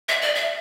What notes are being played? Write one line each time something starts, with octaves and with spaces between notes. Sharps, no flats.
E5
D5
E5